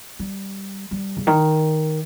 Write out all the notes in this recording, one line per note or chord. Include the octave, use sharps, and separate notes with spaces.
G3
G3
C#3
D#3